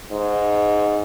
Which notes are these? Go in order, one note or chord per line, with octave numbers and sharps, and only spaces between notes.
G#2